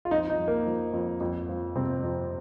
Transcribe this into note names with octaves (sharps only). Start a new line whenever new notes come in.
F4
F2 D#4
D#4
F3
A#3
F3
F2
F2
F3
C3 C4
F2